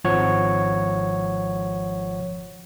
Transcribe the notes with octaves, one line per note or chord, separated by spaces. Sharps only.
G#1 F3 C#5 F#5